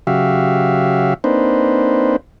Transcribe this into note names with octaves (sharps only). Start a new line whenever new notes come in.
C#3 F#3 F#4 G4 E5 F5
A#3 C4 D4 D#4 B4 C5